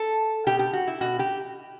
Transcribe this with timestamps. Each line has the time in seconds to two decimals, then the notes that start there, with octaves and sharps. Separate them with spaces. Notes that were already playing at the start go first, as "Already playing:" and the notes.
Already playing: A4
0.47 B2 G4
0.59 G4
0.73 F#4
0.87 E4
1.01 B2 F#4
1.19 G4